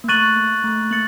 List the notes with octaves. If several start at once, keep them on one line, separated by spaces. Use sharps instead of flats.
A#3
A3 C#6 F#6 A6 D#7 F#7
A#3
A3
A#3 A6 C#7 F#7